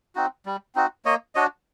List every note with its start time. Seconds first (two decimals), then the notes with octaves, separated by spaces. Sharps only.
0.15 C4 D#4 F#4
0.46 G3
0.75 C4 D#4 F#4
1.05 A#3 C#5 D#5
1.35 D4 F#4 C#5 D#5